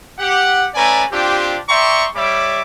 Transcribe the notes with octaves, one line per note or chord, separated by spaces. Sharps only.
G4 F#5
A3 C#4 B4 D5 G#5 A#5
C4 D4 F4 G4
D5 E5 G5 A#5 C6 C#6
G3 C#5 E5 B5 D6